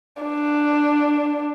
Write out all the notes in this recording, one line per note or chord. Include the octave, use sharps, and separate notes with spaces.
D4